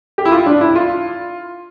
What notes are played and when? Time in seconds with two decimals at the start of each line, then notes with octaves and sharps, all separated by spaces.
0.18 G4
0.25 E4
0.32 F4
0.46 D4
0.61 E4
0.75 F4